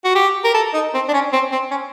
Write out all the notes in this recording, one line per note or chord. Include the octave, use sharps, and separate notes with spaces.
F#4
G4
A#4
A4
D#4
C4
D4
C#4
C4
C4
C#4